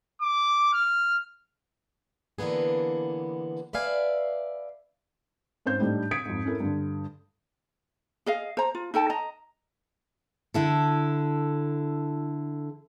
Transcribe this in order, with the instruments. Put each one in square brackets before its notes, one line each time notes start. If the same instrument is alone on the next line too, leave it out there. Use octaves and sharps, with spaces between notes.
[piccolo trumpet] D6
F6
[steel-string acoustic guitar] D3 E3 A#3 B3 G#4
B4 D5 E5 F5 G#5
[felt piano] G#2 C#4 C5 G6
A2 G3 D4 D#4
D#6 G#6 B6 C#7 D7
F2 G#2
C#4 E4 A4 A#4
G2 D3
[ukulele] G#4 D#5 F5
C5 A#5
F4
D#4 A4 G5 A5
D#5 A#5
[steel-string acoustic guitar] D3 E4 A4